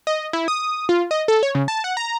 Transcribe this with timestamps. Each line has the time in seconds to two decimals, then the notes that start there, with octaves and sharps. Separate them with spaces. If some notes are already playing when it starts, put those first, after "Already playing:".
0.07 D#5
0.33 E4
0.48 D#6
0.89 F4
1.11 D#5
1.28 A4
1.43 C#5
1.55 C#3
1.68 A5
1.84 F#5
1.97 A#5